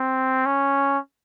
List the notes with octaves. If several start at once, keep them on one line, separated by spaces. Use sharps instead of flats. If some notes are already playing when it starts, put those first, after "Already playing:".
Already playing: C4
C#4